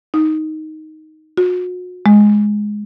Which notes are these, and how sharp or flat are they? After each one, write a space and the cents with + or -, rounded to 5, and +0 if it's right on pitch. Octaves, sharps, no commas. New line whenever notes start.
D#4 +5
F#4 -40
G#3 +5